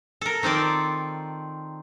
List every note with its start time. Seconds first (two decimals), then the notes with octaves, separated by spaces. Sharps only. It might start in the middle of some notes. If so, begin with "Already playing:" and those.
0.21 A4 A#4
0.43 D#3 C4 F4 D5